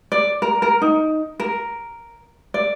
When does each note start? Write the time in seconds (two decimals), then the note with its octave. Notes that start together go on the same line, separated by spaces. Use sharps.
0.12 D5
0.42 A#4
0.62 A#4
0.82 D#4
1.40 A#4
2.54 D5